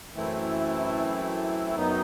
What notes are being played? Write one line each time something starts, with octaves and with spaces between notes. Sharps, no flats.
F#2 E3 A3 C4 E4
F#2 F#3 B3 D#4